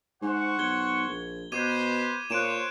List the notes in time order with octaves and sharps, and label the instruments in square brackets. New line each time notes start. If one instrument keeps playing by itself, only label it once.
[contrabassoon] G#2 [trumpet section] C5 F#5 C#6
[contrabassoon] B1 [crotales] G#6 G7
[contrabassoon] A#1
[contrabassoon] B2 [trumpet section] B4 C5 [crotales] D6 G#6 D#7
[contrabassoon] A#2 [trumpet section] C5 C#5 [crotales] F#6 D7 E7